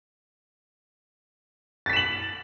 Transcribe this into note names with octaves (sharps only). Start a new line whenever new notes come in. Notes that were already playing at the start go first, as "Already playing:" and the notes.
A6 B6 E7 F#7